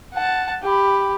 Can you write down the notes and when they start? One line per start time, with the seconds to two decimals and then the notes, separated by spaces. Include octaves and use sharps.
0.14 F#5 A5
0.63 G4 B5